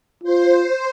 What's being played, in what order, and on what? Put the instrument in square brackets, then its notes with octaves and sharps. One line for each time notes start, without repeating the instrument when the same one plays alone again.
[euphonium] F4 [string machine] C5